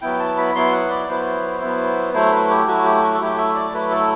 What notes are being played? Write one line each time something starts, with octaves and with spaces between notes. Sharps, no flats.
F#3 B3 E4 G5
A5
B5
F#3 B3 E4 C6
F#5
D5
F#3 B3 E4 C5
F#3 B3 E4
F#3 A3 E4 C5
B4
G4
F#3 A3 E4 F#4
G4
F#4
A4
F#3 A3 E4 G4
E5
D5
F#3 A3 E4 B4
A4